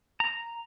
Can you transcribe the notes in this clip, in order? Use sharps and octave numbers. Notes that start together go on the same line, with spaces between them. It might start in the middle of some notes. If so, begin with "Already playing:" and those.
A#5